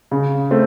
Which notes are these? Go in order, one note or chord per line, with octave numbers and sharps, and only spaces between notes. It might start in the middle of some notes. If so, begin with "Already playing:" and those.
C#3
A3 C4